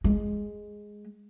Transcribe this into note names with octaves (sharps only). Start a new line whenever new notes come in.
G#3